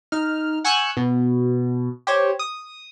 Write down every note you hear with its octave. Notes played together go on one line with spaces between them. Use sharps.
D#4 F6
F#5 G#5 C#6 E6 F#6 G6
B2
G4 C5 C#5
D#6